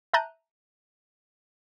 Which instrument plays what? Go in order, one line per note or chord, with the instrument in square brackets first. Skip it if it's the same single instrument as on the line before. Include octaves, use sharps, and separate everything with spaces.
[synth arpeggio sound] E5 A5 A#5 F#6 G6 D#7